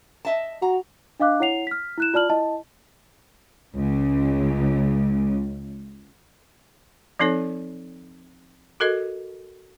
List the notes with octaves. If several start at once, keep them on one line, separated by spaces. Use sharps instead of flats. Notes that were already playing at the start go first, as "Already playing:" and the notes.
D#5 E5 A5
F#4 A#5
D4 D#5 F5 D6 F#6
E4 C#5 F#5 C7 F7
F6 B6
E4 F#6 E7
F4 D5 A5 F6 F#7
E4 D#5 A5
C#2 C#3
F3 C4 D#4 A4 C#5
F#4 A4 A#4 D#5